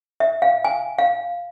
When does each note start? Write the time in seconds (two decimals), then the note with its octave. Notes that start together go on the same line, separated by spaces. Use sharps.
0.20 E5
0.42 F5
0.64 G#5
0.98 F5